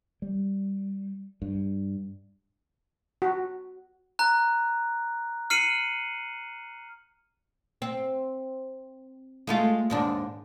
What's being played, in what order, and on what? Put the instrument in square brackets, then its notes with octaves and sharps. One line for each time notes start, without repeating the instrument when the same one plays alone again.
[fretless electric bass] G3
G2
[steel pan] F#4
[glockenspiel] A#5 F#6
F6 C7 C#7 D#7 F#7
[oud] C4
G#3 A3 F4
D#2 G#2 D4